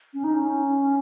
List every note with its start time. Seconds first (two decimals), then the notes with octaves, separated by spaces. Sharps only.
0.14 C#4
0.24 D#4
0.34 C#4